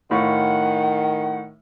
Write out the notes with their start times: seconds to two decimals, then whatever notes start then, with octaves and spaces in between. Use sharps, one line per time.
0.11 A2 D#3 F4 F#5 C#6